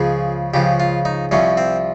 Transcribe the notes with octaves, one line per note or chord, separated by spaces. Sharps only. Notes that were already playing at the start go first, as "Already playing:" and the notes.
Already playing: C#2 C#3 F3 G#4
C#2 C#3 F3 G4
F4
D#4
C2 C3 F3 C#4
C4